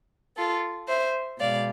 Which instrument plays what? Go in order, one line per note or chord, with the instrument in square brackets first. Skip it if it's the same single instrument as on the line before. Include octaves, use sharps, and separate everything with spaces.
[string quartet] F4 A4
C5 E5
B2 G#3 D5 F5